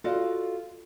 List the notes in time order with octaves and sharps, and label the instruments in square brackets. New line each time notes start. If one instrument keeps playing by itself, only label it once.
[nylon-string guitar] F4 F#4 A4 D5 D#5 F5